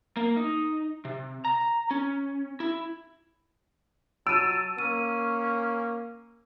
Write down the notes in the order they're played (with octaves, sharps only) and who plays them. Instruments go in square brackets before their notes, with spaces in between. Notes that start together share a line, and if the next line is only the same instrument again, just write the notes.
[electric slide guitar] A#3
D#4
C3
A#5
C#4
E4
[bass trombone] F#3 [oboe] A5 [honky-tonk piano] E6 [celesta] D7 D#7
[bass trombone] A#3 [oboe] C#4 [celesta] D#7